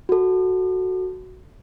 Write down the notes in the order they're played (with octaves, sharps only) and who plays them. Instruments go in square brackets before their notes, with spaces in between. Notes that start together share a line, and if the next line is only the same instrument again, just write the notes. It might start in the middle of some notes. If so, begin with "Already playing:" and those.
[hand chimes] F#4 A4